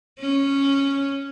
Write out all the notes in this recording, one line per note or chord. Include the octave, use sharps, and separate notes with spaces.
C#4